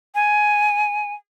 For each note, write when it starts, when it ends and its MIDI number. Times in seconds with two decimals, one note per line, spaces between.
0.15 1.13 80